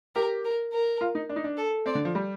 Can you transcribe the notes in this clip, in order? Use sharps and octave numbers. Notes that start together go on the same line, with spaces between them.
G4 A#4
A#4
A#4
F4
D#4
D4
D#4
D4
A4
C4 D5
D3
F3
G3